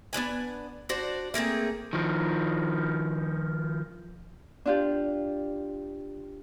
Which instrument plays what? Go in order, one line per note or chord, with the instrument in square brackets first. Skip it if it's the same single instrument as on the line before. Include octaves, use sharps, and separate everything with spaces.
[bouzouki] B3 C4 D4 G#5
D4 F#4 C5
A3 A#3 C4 G#4
[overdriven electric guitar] D#3 F3
[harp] D4 F4 G4